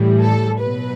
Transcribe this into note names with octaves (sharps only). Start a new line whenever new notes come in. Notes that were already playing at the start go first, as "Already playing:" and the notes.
Already playing: A2 E3 G3
A4
B2 F#3 B4